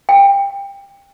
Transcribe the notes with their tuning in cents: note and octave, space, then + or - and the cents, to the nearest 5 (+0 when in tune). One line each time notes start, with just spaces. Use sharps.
G5 +25